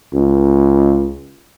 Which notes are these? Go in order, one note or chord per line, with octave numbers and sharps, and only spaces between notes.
C#2